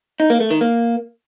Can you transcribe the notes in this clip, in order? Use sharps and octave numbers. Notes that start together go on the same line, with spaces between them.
D#4
A#3
A3
D#3
A#3